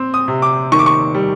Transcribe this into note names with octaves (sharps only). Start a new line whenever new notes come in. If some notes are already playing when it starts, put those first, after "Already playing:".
Already playing: C4
D#6
C3
D6
D#3 C#6
D6
C#6
G3